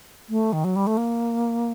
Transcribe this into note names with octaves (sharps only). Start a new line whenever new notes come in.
A3
D#3
F#3
G3
A3
A#3